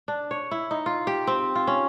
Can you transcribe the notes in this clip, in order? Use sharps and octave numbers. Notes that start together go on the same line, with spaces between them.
D4
C#5
E4
D#4
F4
G4
C4
F4
C#4